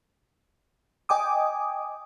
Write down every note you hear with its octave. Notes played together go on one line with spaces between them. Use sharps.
D#5 G5 G#5 D6 D#6